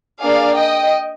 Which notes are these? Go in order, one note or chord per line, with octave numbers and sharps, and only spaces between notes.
A#3 D4 G#4 D5 F5
D#5 G5